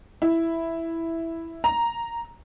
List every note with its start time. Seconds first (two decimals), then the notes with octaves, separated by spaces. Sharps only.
0.22 E4
1.64 A#5